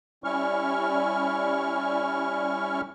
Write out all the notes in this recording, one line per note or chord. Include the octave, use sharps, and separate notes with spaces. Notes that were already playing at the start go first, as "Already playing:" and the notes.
G3 C#4 E4 C#6 F6